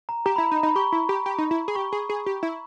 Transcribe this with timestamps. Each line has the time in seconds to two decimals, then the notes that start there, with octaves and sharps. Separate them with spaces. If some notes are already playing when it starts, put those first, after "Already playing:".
0.09 A#5
0.26 G4 A#5
0.36 E4 B5
0.46 A#5
0.51 D#4
0.57 A#5
0.63 D#4
0.66 B5
0.76 G4 C#6
0.92 E4
1.09 G4
1.26 G4
1.38 D#4
1.51 E4
1.68 G#4
1.75 G4 C#6
1.92 G#4
2.09 G#4
2.26 G4
2.43 E4